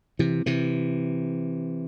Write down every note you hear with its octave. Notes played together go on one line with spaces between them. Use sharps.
C3 E3
C3 E3